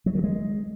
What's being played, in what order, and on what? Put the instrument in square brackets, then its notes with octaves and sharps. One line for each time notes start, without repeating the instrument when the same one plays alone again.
[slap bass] F#3
D#3
G#3